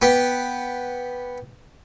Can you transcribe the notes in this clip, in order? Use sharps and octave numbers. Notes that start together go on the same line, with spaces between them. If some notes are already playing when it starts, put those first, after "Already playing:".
B3 G4